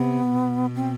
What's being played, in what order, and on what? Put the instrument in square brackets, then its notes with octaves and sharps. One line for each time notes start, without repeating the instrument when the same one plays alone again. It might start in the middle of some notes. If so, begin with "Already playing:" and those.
Already playing: [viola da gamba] C3 [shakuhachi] B3
[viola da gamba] B2
[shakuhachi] C4